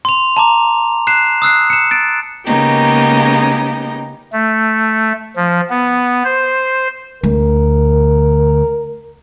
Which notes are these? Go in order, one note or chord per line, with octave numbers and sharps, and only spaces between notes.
C6 F7
A5 A#5 D6 F7
F#6 C7 E7
D#6 E6 F#6 C7
C#7 E7
A6 D7
C#3 G#3 A#3 B3 D#4 G4
A3
F3
B3
C5
D2 A#4